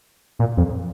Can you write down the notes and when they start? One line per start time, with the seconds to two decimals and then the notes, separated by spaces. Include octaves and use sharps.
0.39 A#2
0.57 F2